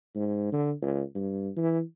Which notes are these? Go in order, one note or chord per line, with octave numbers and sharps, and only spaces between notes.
G#2
D3
C#2
G2
E3